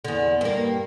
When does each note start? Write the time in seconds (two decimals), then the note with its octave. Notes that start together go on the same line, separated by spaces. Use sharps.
0.05 E2 D3
0.41 G2 A#3